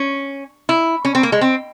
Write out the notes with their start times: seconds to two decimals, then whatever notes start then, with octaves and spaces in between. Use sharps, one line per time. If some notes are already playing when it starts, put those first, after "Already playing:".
Already playing: C#4
0.69 E4
1.05 C#4
1.15 C4
1.23 A#3
1.32 G#3
1.41 C4